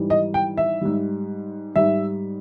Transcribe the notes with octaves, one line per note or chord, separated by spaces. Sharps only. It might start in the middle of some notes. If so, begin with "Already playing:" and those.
Already playing: G#2 E3 G3
D#5
G5
E5
G#2 G3
G#2 G3 E5